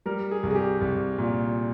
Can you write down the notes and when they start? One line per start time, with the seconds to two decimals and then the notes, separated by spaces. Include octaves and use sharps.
0.06 G3 A#4
0.31 G#4
0.43 C2
0.51 G#4
0.55 G4
0.81 C2
1.18 A#2